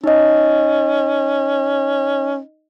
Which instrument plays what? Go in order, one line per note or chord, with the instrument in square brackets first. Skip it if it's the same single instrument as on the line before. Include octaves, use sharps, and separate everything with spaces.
[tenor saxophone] C#4 [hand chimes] D#4 D#5